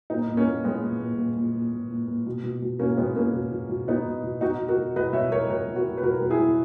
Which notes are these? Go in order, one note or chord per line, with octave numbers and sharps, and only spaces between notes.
A#2 B3 D#4
A#2
A#3 C#4
A#2
A#2 G#3 B3
A#2
A#2
A#2
A#2
A#2
A#2
A#2
A#2
B2
B2
B2
B2 A#3 C#4
B2 G#3 B3
B2 A#3 C#4
B2
B2
B2
B2 B3 D#4
B2
B2
B2 D#4 F#4
B2
F#4 A#4
B2
B2 B4 D#5
B2 C#5 E5
B2 A#4 C#5
B2 A#4 C#5
B2
F#4 A#4
B2
B4
B2 F#4 A#4
B2 A#4
E4 G#4
B2